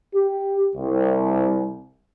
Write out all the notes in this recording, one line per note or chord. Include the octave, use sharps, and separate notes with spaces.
G4
C2